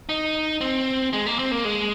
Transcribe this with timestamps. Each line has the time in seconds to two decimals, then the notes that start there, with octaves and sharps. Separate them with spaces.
0.09 D#4
0.61 C4
1.13 G#3
1.26 A#3
1.39 C4
1.51 A#3
1.65 G#3